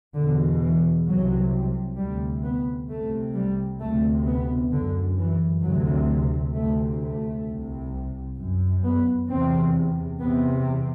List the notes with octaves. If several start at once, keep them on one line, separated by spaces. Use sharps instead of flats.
E2 B2 D3
E3
C2 C3 F#3
D2 C3 G3
B3
C2 C3 A3
G3
D2 C3 A3
B3
F#2 D3
E3
D2 C3 F#3
D2 C3 A3
A3
C2 C3
F#2
B3
E2 C3 C4
E2 C3 B3